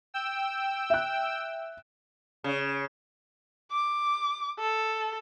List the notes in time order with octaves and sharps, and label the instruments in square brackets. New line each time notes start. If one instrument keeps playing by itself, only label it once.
[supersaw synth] G5 E6
[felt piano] E5 F#6
[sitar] C#3
[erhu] D6
A4